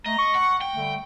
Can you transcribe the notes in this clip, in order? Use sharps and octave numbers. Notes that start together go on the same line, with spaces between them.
A3 D#5 A#5
C#6
F#5
G5
D3 G3 A3